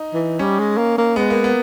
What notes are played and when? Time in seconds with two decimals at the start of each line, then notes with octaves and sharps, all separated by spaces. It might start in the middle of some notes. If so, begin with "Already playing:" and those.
Already playing: D#4
0.14 E3
0.39 G3 C#4
0.59 G#3
0.77 A#3
0.98 A#3
1.16 G#3 B3
1.30 A#3
1.44 B3